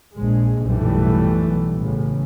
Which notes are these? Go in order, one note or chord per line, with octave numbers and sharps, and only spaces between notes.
A#1 G#3
B1 F#2 A2 E3 G3 A3
A1 C#3